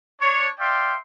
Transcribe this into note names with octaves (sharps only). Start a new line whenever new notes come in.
D4 C#5
D5 E5 F5 G5 C6